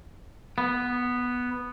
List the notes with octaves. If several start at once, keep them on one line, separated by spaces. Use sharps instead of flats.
B3